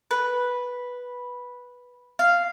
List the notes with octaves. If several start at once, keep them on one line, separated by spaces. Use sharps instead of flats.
B4
F5